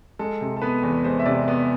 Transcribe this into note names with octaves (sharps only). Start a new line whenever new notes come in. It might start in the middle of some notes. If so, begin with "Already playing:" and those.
G#3 A4
C3
A4
B3 B4
E2
G#3 C5
E5
C3 D5
B3